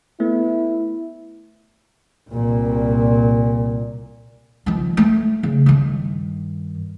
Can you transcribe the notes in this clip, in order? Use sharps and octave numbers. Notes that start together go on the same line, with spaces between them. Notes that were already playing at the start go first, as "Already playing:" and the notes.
A3 B3 E4
C2 A#2
D#3 F3
A3
C#3
G2 D#3